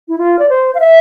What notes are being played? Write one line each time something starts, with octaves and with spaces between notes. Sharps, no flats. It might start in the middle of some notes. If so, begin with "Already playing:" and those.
E4
F4
D5
C5
F5
E5